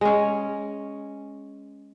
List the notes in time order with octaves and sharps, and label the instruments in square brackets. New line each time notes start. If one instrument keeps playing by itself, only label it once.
[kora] G#3 C#4